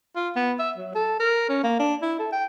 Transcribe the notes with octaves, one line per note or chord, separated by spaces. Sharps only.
F4
B3
E5
F#3
A4
A#4
C#4
A#3
D4
E4
A4
G5